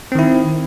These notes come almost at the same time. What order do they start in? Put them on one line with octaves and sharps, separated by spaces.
C4 D#3 E4